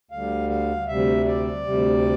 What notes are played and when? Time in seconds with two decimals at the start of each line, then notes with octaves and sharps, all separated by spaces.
0.11 D2 D3 G3 F5
0.50 F5
0.88 D2 C3 G3 E5
1.26 D5
1.64 D2 C3 G3